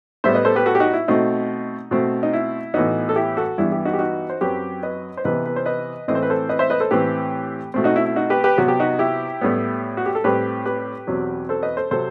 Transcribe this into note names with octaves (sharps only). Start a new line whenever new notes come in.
A2 G3 B3 C5 E5
B4 D#5
A4 C5
G4 B4
F#4 A4
G4
D#4 F#4
E4
B2 A3 C4 D#4
B2 A3 C4
D#4
E4
A2 E3 B3 D#4 F#4
A4
E4 G4
F#4 A4
G2 E3 G3 B3 E4
E4 G4
D#4 F#4
G4
D#4 F#4
C5
F#2 F#3 C4 G4 B4
B4 D#5
C5
C3 E3 B3 B4 D#5
B4
C5
B4 D#5
A2 E3 A3 C4 D#5
C5
B4
A4 C5
B4 D#5
C5 E5
B4 D#5
A4 C5
A2 E3 A3 C4 G4 B4
B2 A3 C4
D#4 F#4
E4
E4
D#4 F#4
G4 B4
G4 B4
C3 F#3 B3 F#4
G4
D#4 F#4
E4 G4
A2 G3 B3
F#4
G4
A4
A2 G3 C4 G4 B4
G4 B4
E2 B2 F#3 C4
A4 C5
B4 D#5
A4 C5
C3 F#3 A4 C5